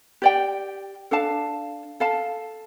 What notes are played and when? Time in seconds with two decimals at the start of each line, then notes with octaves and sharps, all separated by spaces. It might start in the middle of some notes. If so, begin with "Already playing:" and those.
0.22 G4 D5 G5
1.11 D4 A4 F5 A5
2.00 A4 F5 A5